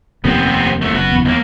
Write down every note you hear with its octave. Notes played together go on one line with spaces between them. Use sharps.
F1 D#2 C3 D#3 B3 C4
C2 A3
F#1 F#4 B4
E2
D#2 A#3